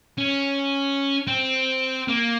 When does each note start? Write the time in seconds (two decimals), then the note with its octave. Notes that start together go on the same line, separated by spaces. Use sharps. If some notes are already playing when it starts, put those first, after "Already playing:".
0.18 C#4
1.27 C4
2.08 A#3